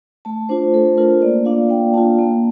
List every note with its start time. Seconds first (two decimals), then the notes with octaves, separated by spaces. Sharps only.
0.25 A3 A5
0.49 D4 F4 C5
0.74 A3 A4
0.97 D4 F4 A#4
1.22 A#3 D5
1.45 D4 F4 F5
1.70 A#3 G5
1.94 D4 F4 A5
2.19 A#3